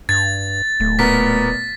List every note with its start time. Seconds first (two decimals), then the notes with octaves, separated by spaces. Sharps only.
0.09 G2 G#6 A6
0.80 D1 A3
0.99 A#2 B3 A#4 B6